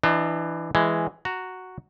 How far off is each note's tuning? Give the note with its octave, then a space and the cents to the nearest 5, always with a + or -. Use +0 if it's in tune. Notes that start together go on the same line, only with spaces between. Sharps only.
E3 +10 D4 +30 D#5 +5
E3 +5 G#3 +0
F#4 +0 A#5 -10